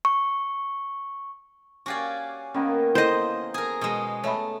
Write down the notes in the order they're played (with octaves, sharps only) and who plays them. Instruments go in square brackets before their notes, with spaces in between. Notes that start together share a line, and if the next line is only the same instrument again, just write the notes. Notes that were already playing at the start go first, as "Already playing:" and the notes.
[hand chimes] C#6
[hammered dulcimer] C#4 F5 G#5 [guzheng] F#4 G4 D5
[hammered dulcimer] D#3 A#3 B3 [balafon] C#4
[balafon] E4 A4 [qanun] C5 D#5
[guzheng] G#4 A#4
B2 G#3
[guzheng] A3 [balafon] C#5 E5 B5